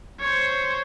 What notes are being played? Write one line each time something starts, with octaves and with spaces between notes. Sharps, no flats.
C5 C#5